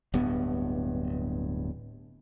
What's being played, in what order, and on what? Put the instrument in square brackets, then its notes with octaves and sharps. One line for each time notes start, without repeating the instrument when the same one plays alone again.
[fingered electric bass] D1 G2 B3